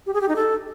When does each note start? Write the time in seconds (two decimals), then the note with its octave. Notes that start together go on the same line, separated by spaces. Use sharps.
0.06 G4
0.14 G#4
0.21 G4
0.28 D#4
0.36 A4